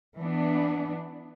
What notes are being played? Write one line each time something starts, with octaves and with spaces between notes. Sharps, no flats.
E3 B3 D4